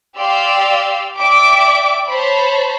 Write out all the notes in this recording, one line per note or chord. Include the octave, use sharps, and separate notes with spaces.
G4 D5 F5 C6 E6
D5 E5 G5 D6
C5 C#5 A5 B5